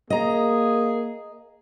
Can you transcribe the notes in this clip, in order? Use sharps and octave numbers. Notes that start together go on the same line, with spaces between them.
A#3 G#4 D#5 A#5